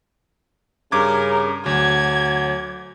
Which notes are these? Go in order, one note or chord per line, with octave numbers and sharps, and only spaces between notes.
G2 C#3 A#4 D6 G#6
D2 F#3 G#6